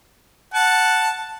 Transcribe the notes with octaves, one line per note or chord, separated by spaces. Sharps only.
F#5 A5